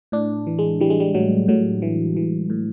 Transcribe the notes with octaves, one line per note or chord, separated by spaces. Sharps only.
A2 D4
E3
G#3
E3 G3
G#3
G3
A2 F#3
A2 F#3
E3
E3
A2